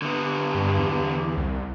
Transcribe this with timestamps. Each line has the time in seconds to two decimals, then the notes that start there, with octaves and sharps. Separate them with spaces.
0.02 D3 B3
0.55 G2
0.78 E2
1.37 C2